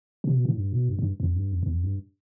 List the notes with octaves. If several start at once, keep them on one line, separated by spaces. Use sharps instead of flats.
C3
B2
A2
G2
B2
G2
G2
F2
G2
F2
E2
F2
G2